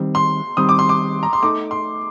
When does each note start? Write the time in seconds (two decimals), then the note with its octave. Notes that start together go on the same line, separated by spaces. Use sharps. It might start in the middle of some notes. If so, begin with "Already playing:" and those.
Already playing: D#3 G3 C4
0.15 C6
0.57 D#3 G3 C4 D#6
0.69 D6
0.79 C6
0.89 D6
1.23 A#5
1.33 C6
1.42 A3 D#4 A4 D6
1.71 C6